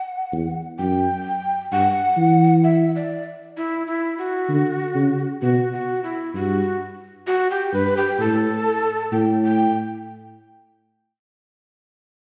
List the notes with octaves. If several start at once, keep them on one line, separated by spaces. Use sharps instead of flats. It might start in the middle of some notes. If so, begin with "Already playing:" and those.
Already playing: F#5
E2
F#2 G5
G2 F#5
E3
E5
D5
E4
E4
F#4
D3
C#3
B2 F#4
F#4
E4
G2 F#4
F#4
G4
G2 B4
G4
A2 A4
A2 G5
G5